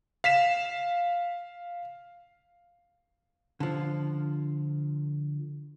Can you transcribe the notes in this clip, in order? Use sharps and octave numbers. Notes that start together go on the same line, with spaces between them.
F5 B6 E7
D3 F3